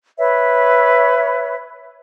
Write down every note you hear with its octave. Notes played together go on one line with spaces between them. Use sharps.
B4 C#5 E5